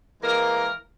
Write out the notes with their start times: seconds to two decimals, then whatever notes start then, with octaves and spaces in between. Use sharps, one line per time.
0.22 E3 G#3 A#3 A#4